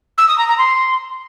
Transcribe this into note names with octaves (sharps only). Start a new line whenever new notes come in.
E6
D#6
A#5
A#5
C6